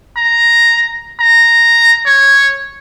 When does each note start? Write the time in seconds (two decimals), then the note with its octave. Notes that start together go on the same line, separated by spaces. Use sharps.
0.17 A#5
1.20 A#5
2.06 C#5